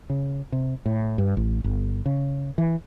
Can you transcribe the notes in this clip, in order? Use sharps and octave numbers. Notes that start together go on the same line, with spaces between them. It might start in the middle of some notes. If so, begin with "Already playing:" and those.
C#3
C3
A2
G2
A1
G1
C#3
E3